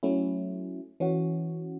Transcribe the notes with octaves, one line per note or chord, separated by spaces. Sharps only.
F#3 A3 C#4 E4
E3 C#4 F#4